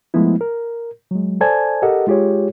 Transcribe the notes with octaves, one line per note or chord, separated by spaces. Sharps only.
F3 G#3 A3 B3 E4
A#4
F#3 G#3
A4 C5 D5 G#5 A5 G#6
G4 A4 A#4 D#5 F#5
G#3 F4 G4 G#4 C#5